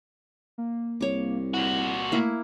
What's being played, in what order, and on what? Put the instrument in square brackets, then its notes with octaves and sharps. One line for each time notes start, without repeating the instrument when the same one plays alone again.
[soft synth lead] A#3
[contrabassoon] C2 [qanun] C#5 D6
[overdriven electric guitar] A#2 F#4 [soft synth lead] E4
[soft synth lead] A3 [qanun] A#3 E4